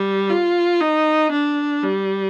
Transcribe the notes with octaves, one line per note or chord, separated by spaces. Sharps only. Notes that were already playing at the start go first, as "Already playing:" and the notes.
Already playing: G3
F4
D#4
D4
G3